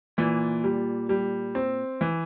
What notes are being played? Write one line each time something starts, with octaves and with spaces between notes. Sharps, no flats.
A#2 E3
G3
G3
C4
E3